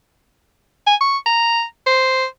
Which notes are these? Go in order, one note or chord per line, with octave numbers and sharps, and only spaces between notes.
G#5
C#6
A#5
C5